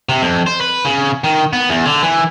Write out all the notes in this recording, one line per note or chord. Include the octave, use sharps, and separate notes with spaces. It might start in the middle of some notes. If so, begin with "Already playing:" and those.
C3
F2
C5
B4
C#3
D#3
B3
E2
D3
E3